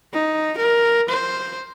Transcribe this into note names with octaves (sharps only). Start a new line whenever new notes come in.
D#4
A#4
C5